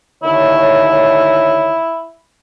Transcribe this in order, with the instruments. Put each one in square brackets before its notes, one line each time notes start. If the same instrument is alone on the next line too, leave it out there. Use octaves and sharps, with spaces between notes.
[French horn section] D#2 D3 C#5 [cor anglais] E4